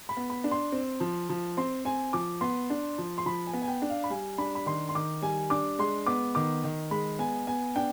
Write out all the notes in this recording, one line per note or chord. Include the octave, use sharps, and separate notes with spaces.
B5
B3
B5
D4
C6
C4
F3
F3
C4 C6
C4 G#5
F3 D6
B3 C6
D4
F3
C6
F3 B5
G#5
B3
G#5
G5
D4
F5
B5
G3 G#5
D4 B5
B5
D#3 C6
C6
D#3 D6
G3 G#5
D4 D6
G#3 C6
B3 D6
D#3 D6
D#3
G#3 B5
B3 G#5
B3 G#5
D4 G5